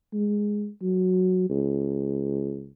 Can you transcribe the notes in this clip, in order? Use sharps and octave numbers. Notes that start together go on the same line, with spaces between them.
G#3
F#3
C#2